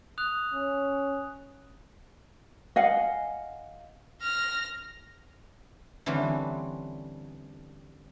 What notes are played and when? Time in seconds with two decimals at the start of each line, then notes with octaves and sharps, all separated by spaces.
0.18 D#6 F#6 F7
0.54 C#4
2.76 D#5 F5 F#5 G#5
4.22 F6 A#6
6.06 D3 E3 G3 C4 C#4